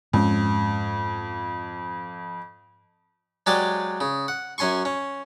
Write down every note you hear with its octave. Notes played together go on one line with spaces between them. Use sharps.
F2 G#2 G#3 C#4
F#3 G#3 G4 G#4 C5 D5
C#3
F#5
F#2 C#4 G#5 C6 C#6
C#4